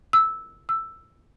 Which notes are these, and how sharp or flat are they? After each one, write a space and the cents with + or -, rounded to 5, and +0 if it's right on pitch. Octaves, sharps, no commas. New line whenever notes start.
E6 -10
E6 +5